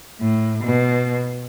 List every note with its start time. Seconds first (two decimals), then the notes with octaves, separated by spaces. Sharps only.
0.20 A2
0.64 B2